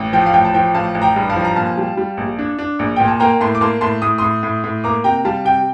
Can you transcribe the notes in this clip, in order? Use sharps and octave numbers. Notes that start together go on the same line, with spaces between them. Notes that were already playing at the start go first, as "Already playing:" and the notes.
Already playing: A1
F3 G5
F5
A1 G5
A5
F3 G5
A1 F5 A5
A1
G5 A#5
G2
F5 A5
F3
A#5
A#2 F5 A5
G3
G3
A#1
D4
D4
A#1
A#2 G5
A5
A#3 G5 A#5
A2 A5 C6
D6
A#3 A5 C6
A2 A5 C6
A2 D#6
A2 C6 D#6
A2
A2
A#3 A#5 D6
C3 G5 A#5
G3 F5 A5
C3 G5